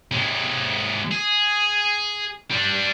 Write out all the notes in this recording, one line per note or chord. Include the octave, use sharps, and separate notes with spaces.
D#2 G#3
G#4
G3 D4